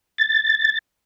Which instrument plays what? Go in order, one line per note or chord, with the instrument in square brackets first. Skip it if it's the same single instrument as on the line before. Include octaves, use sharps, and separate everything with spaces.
[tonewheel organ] A6